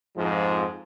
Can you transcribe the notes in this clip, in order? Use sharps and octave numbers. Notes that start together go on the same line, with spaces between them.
F2 G#2 F3